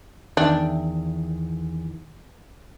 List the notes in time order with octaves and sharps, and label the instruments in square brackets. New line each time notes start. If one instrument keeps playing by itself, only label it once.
[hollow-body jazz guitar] E2 E5 G5 [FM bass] D#3 [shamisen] D4